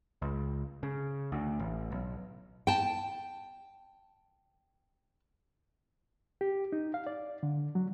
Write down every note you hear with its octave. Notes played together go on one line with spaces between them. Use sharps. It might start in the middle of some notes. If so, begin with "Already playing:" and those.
C#2
C#3
D2
A1
B1
G5 A5
G4
D#4
F5
D5
D3
F#3